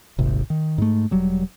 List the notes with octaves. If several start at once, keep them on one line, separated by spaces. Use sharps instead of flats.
D#1 G#1 C3
D#3
G#2 A3
E1 F#3 G3